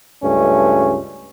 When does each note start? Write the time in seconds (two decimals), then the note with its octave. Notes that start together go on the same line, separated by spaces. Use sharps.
0.22 C#2 G2 A3 C#4